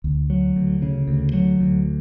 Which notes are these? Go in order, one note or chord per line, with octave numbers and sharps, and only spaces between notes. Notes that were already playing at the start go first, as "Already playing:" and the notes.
D2
F#3
D2
C#3
D2
F#3
D2